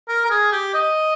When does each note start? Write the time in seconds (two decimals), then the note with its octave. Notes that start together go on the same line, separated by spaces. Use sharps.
0.08 A#4
0.25 A#4
0.30 G#4
0.52 G4
0.74 D#5